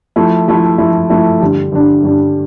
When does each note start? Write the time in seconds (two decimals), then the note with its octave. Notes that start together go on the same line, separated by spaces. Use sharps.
0.16 F3 A3 E4
0.48 F3 A3 E4
0.78 F3 A3 E4
1.09 F3 A3 E4
1.41 G2 D3 G3 D4
1.72 G2 D3 G3 D4
2.03 G2 D3 G3 D4